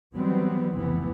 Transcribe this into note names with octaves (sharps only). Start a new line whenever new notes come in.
D#3 E3 F#3 G3 B3 C4
F1 C#2 C3 E3 B3